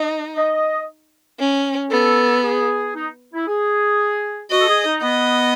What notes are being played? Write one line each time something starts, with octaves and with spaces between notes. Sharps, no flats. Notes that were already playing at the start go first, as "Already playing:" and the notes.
Already playing: D#4 D#5
D#5
C#4
B3 A4
G#4
D#4
E4
G#4
F#4 D#5
A4
G#4
D#4
B3 D#5